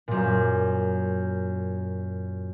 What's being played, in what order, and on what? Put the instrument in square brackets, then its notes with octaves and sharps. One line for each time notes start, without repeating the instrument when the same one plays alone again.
[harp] F#2 A#2